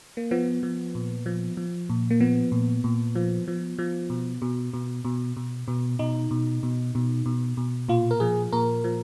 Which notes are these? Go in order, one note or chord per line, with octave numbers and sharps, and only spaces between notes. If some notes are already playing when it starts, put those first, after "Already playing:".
A#3
F3 B3
F3
A#2
F3
F3
A#2
A#3
F3 B3
A#2
A#2
F3
F3
F3
B2
B2
B2
B2
B2
B2
B2 D#4
B2
B2
B2
B2
B2
A#2 F4
A#4
F3 G#4
A#2 A#4
F3